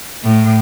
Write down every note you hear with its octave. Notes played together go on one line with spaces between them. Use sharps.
A2